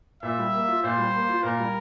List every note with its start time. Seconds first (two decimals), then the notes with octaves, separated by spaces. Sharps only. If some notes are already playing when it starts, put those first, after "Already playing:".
0.23 A#2 E5
0.38 G3
0.53 A#3
0.68 F4
0.83 A#2 C5
0.98 G3
1.14 A#3
1.29 F4
1.43 A#2 A#4
1.59 G3